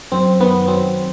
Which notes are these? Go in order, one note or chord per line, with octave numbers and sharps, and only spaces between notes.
F#2 C4
D#3 B3
F#3 C4